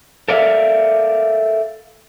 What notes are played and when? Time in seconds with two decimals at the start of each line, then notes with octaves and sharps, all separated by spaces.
0.28 A4 A#4 D5 E5 F5